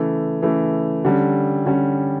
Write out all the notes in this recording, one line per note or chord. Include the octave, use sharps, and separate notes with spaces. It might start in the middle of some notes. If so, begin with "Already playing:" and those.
Already playing: C#3 E3 A3
C#3 E3 A3
D3 G3 C#4
D3 G3 C#4